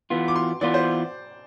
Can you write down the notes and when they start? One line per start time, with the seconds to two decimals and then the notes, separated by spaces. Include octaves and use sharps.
0.10 E3 B3 F4
0.28 D6
0.36 C6
0.61 E3 B3 F4 D5
0.74 C5